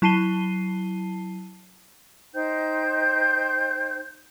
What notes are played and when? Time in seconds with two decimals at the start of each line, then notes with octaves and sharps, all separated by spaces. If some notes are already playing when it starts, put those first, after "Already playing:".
0.02 F#3 E4 A5 C7 D#7 G7
2.34 D#4 C5 G5 G6